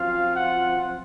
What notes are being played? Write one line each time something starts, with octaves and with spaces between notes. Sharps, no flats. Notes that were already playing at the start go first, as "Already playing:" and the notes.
Already playing: F#2 F3 C4 F4 F5
F#5